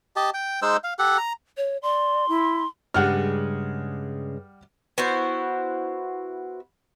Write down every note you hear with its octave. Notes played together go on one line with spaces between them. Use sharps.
G4 D#5 A5
G5
G#3 D#4 C5 E6
F5
G4 A4 F#5
A#5
C#5
D5 C6
E4
G2 C#3 G3 G#3 F#5 F6
B3 E4 F#4 C5